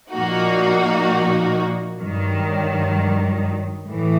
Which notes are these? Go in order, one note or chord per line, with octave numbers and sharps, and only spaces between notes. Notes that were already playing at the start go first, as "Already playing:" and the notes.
A#2 F3 A#3 D#4 F#4
G2 D#3 F#3
A2 E3